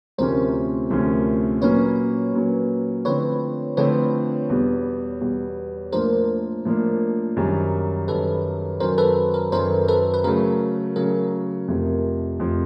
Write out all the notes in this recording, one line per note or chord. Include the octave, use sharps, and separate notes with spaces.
D2 C3 F3 A3 C#4 A#4 C5
D2 C3 F3 A3 C#4
A#2 F#3 A#3 C#4 B4 C#5
A#2 F#3 A#3 C#4
D3 F3 A3 C4 E4 B4 C#5
D3 F3 A3 C4 E4 B4 C#5
E2 B2 G3
E2 B2 G3
A2 F3 A#3 D4 A#4 C5
A2 F3 A#3 D4
F#2 D#3 G3
F#2 D#3 G3 A4 B4
F#2 D#3 F#3 A#4 C5
A4 B4
A#4
F#2 D#3 F#3 A#4 C5
A4 B4
B4
C#3 F#3 A3 A#4
C#3 F#3 A3 A#4
F2 C3 F3 A3
F2 C3 F3 A3